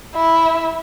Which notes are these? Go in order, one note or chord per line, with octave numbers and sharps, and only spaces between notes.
E4